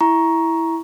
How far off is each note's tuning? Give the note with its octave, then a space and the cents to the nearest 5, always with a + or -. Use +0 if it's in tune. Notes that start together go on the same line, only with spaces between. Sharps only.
E4 +0 A#5 +15 C#6 +0